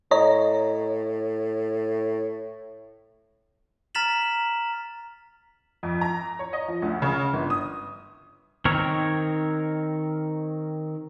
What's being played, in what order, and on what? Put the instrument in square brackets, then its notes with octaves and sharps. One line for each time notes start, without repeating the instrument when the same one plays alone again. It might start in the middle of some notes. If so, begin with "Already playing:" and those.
[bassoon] A2 [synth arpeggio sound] C#5 D#5 A#5
[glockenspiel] A#5 F6 A6 B6 E7 F#7
[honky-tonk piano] F2
A#5
C#5
D#5
F3
D2
C#3
G1
D#6
[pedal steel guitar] D#3 C4 A#4 C#5